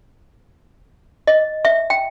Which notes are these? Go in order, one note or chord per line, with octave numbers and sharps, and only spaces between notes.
D#5
E5
G5